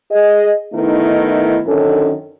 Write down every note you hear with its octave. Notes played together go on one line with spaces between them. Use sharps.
G#4 D#5
D#3 A3 B3 D#4 E4
F#2 D3 D#3 C#4 A4